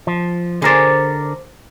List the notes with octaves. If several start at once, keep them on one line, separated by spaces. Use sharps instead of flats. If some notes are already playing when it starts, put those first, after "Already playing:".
F3
D3 G#4 A#4 C5 D5